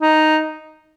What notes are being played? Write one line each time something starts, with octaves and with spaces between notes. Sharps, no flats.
D#4